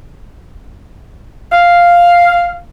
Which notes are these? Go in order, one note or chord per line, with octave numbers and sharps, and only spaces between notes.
F5